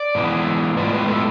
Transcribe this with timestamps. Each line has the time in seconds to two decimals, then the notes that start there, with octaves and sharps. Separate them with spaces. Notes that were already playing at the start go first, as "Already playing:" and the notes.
Already playing: D5
0.15 G#2 E3 B3
0.77 A2 G#3 B3 F4 D5
0.93 B4
1.08 A4